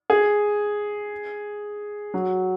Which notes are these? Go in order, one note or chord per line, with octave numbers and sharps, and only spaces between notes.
G#4
F#3